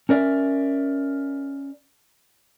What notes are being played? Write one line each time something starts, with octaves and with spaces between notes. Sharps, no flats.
C#4 A#4 D5 E5